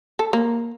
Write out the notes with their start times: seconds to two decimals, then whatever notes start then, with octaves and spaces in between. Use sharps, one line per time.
0.19 A4
0.33 A#3